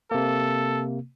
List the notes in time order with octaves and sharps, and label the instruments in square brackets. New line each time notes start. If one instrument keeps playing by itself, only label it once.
[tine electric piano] C3 A#3 [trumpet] A4